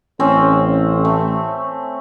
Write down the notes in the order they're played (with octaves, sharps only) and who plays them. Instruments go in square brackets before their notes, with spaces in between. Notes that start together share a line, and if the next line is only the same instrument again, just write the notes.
[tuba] A1 [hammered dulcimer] C4 C#4
[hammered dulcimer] A3